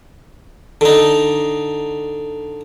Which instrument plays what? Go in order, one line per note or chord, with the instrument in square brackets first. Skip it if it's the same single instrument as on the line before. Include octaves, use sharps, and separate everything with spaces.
[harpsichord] D3 D#4